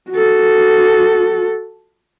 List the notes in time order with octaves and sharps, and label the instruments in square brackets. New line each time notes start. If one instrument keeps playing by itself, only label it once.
[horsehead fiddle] F#4 A4